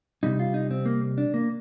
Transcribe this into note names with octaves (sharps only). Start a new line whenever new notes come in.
C3 G3 D#4
F4
D#4
C4
A#3
D4
A#3